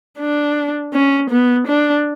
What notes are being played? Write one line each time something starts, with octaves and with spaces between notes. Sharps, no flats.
D4
C#4
B3
D4